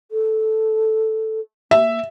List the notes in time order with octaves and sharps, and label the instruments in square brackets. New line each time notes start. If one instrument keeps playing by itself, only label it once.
[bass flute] A4
[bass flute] A#3 [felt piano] E5